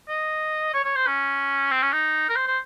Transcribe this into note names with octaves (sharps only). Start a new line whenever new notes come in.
D#5
C#5
C#5
C5
C#4
C4
C#4
D#4
A#4
C5
C5